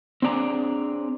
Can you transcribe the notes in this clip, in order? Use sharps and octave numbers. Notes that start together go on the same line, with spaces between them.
C4 D4 G#4 D5 A#5